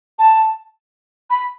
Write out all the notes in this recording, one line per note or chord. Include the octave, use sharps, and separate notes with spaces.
A5
B5